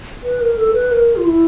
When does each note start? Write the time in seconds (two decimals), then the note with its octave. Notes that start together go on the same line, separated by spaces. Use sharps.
0.24 B4
0.41 A#4
0.57 A4
0.74 B4
0.92 A#4
1.16 F4
1.25 E4